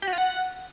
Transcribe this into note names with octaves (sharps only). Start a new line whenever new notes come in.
G4
F#4
F4
F#5